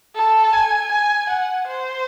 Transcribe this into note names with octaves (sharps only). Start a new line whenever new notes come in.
A4
G#5
G#5
F#5
C5